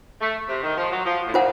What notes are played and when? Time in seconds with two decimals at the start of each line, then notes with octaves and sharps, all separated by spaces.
0.21 A3
0.49 C3
0.63 D#3
0.77 F3
0.92 F#3
1.06 F3
1.28 A2
1.34 A#2 F4 C5 F#5